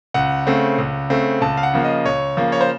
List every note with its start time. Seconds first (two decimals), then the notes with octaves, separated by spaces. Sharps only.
0.14 C#2 F#5
0.47 C#3 A3 C4
0.78 C#2
1.10 C#3 A3 C4
1.41 C#2 A5
1.57 F5
1.63 F#5
1.74 C#3 F3 A#3
1.84 D#5
2.05 C#2 C#5
2.37 C#3 F3 A#3
2.52 C#5
2.61 C5